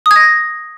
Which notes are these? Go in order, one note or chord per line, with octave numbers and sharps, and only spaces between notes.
D#6 G#6 A#6